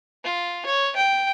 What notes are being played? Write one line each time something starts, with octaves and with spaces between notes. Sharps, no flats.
F4
C#5
G5